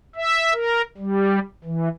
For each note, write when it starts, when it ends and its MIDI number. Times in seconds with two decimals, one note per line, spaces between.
0.16 0.53 76
0.53 0.82 70
0.98 1.39 55
1.64 1.89 52